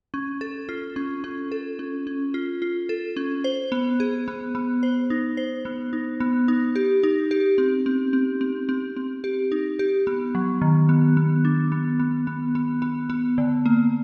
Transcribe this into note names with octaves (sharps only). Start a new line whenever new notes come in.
C#4
A4
F4
C#4
C#4
A4
C#4
C#4
F4
F4
A4
C#4
C5
B3
G#4
B3
B3
C5
D#4
C5
B3
D#4
B3
D#4
G4
D#4
G4
C4
C4
C4
C4
C4
C4
G4
D#4
G4
B3
F#3
D#3
B3
B3
D4
B3
B3
B3
B3
B3
B3
D3
A#3